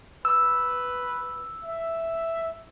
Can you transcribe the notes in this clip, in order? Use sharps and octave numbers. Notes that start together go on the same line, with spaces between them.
B4 E6
E5